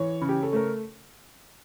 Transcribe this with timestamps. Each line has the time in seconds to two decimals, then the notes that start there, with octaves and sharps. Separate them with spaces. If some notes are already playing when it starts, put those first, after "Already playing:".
Already playing: E3 C#5
0.21 C#3
0.29 G4
0.43 A4
0.53 A3 A#4